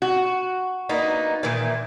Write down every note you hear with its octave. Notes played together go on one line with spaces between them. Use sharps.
F#4
A#3 B3 D#4
A#2 D#3 E3